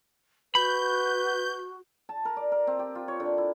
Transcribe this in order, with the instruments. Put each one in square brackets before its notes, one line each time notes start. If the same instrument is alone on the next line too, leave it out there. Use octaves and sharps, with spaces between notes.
[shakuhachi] F#4 [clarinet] B4 [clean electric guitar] B5 [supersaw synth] G6
[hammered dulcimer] A5
A#4
D5
A#4
C4
G4
F4
C#5
D3
E4